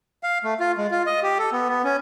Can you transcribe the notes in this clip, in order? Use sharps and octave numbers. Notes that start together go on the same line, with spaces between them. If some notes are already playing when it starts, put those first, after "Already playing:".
F5
A3
F4
G#3
F4
D#5
G4
A4
B3
B3
C#4